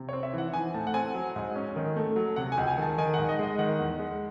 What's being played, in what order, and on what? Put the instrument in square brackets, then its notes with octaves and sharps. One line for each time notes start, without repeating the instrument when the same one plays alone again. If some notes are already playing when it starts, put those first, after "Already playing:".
Already playing: [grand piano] C3
C4 C#5
E5
E3 F#5
E3 G#5
A2 A5
F#5
C4 G#5
F#3
G#2
C#4
D#3
A3
F#3
C3 F#5
G#5
C#2
G#5
D#3 A5
D#3 G#5
F#5
G#2
D#5
G#3 D#5
D#3 F#5
E2
G#3